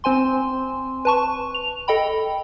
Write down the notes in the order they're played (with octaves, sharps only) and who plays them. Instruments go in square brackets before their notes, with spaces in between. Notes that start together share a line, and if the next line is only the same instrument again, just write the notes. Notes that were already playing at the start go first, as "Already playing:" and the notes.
[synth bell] C4 C5 G#5 C6
B4 A5 C#6
F7
A4 D#5 G5 B5